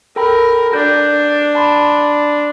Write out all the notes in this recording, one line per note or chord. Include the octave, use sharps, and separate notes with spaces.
A4 A#4 G5 B5
D4 G6
A5 B5 C6